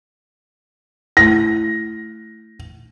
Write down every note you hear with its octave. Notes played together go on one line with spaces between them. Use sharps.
A3 E4 A#6